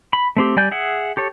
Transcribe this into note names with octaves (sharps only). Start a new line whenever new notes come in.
B5
A3 C4 G4
G3 D5 G#5 G6
G#4 E5 F#5
G4 A4 C#5